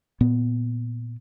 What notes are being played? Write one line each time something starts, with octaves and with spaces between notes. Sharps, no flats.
A#2 B3